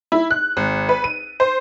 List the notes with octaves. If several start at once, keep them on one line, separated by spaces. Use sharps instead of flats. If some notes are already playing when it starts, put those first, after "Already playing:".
E4
F#6
G#1
B4
D#7
C5